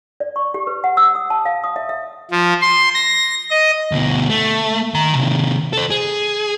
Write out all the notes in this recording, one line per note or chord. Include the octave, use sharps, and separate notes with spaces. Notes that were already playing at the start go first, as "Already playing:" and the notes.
D5
C#6
G4
B4
F#5
E6
D#6
A5
F5
D#6
E5
E5
F3
C6
A#6
D#5
D2 B2
A3
D#3 A#5
C3 D#3
A4 C5
G#4